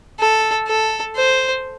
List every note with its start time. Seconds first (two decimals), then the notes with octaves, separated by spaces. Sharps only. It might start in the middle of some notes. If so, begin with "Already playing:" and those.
0.19 A4
0.68 A4
1.16 C5